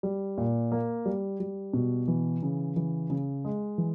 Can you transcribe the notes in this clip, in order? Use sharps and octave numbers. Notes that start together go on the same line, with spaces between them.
G3
A#2
A#3
G3
G3
B2
E3
C#3
E3
C#3
G#3
E3